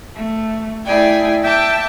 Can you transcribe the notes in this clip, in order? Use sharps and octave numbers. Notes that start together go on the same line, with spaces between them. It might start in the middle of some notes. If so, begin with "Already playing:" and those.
A3
A3 E4 G#4 D5 G5 G#5
E5 G5 A5 D6